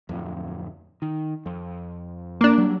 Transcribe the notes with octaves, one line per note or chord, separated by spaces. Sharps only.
D1 F2
D#3
F2
A#3 D4
F#3 G3